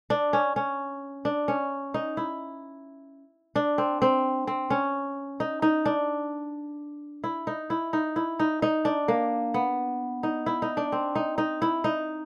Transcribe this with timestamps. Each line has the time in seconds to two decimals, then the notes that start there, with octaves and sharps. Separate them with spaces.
0.10 D4
0.33 C#4
0.56 C#4
1.25 D4
1.48 C#4
1.94 D#4
2.17 E4
3.56 D4
3.78 C4
4.02 C4
4.47 C4
4.70 C#4
5.40 D#4
5.62 D#4
5.85 D4
7.24 E4
7.47 D#4
7.70 E4
7.93 D#4
8.16 E4
8.40 D#4
8.62 D#4
8.85 D4
9.08 A#3
9.54 B3
10.23 D#4
10.46 E4
10.62 D#4
10.77 D4
10.92 C4
11.15 D#4
11.38 D#4
11.62 E4
11.84 D#4